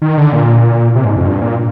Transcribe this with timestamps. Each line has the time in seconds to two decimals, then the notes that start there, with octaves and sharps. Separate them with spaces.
0.02 D#3
0.18 D3
0.33 A#2
0.96 C3
1.05 G#2
1.16 F2
1.26 G2
1.42 A#2